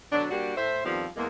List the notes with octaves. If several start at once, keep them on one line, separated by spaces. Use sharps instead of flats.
B2 D3 F#3 D4
G3 A#3 D4 F#4 G4
A2 C5 E5
F2 D#3 F3 G3 B3 C4
E2 G#3 A#3